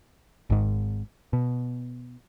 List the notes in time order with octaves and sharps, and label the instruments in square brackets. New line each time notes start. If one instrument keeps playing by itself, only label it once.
[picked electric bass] G#1 G#2
B2